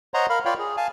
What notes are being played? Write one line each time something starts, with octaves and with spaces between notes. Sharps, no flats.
C5 C#5 D#5 F#5 A#5 C6
A#4 F5 B5
F4 C#5 D5 F5 G5 B5
G#4
F5 G#5 A5